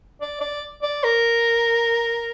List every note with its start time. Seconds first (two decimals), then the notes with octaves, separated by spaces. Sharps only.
0.21 D5
0.41 D5
0.83 D5
1.04 A#4